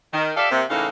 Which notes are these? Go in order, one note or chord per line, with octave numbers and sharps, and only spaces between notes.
D#3
G4 A4 D5 E5 F5
C3 A#3
A2 C#3 E3 A#3 D#4 F5